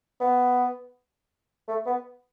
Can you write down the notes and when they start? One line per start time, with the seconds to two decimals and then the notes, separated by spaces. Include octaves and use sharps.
0.21 B3
1.68 A3
1.86 B3